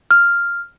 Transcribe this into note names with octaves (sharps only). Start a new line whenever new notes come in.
F6